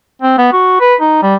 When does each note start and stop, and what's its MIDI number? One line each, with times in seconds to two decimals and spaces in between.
0.21 0.35 60
0.38 0.48 59
0.52 0.79 66
0.80 0.95 71
1.01 1.21 63
1.22 1.35 55